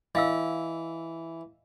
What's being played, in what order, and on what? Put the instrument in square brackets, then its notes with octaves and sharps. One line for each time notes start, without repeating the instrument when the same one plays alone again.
[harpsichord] E3 [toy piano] D#5 F5 E6